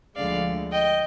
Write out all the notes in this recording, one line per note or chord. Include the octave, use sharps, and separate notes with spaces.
D2 D3 F3 G#3 D5 F5
D#5 G5